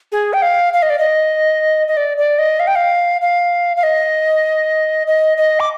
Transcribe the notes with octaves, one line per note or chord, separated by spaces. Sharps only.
G#4
G5
F5
F5
D#5
D5
D#5
D#5
D5
D5
D#5
F5
G5
F5
F5
F5
D#5
D#5
D#5
D6